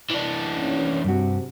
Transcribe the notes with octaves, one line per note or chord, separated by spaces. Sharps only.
E3 D4
D#2 C#4
G2 C3 F#4